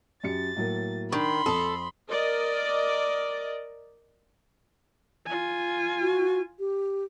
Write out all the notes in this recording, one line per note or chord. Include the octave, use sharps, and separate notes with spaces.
F#2 G4 A6 C#7
A2 F#3 A#3
D#3 D4 B5 C6
F2 C4 A4 D#6
A#4 D5 D#5
F4 G#5
F#4
G4